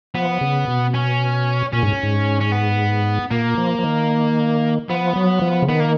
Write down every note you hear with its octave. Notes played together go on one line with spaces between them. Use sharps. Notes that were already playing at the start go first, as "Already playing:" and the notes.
F3 B3
C#3
B2
C#4
A#2 C#4
G#2
G#2
C#4
B3
A#2 A#3
F3
F3
D#3
F3 B3
F#3
F3
C#3
D#3 B3
A#3